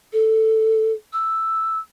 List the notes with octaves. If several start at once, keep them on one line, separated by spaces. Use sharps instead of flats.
A4
E6